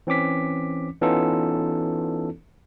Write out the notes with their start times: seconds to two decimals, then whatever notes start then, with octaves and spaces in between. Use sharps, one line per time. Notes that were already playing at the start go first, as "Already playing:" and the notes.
0.07 E3 C4 C#4 D6 B6
1.01 E3 B3 C#4 D#4 F4 A4